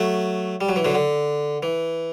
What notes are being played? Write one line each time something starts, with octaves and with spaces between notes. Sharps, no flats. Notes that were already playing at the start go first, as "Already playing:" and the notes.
Already playing: F#3 A3
G3
F#3
E3
D3 F#3
D3
E3